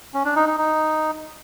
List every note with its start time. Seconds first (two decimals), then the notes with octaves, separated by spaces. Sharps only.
0.14 C#4
0.25 D4
0.36 D#4
0.47 D#4
0.58 D#4